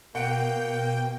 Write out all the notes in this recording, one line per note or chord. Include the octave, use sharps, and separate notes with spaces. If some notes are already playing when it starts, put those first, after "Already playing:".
B2 A#3 F#5 G5 C#7 D7